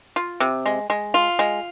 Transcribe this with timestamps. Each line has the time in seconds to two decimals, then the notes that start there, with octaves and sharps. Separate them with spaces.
0.16 F4
0.40 C3
0.66 G#3
0.90 G#3
1.14 F4
1.39 G#3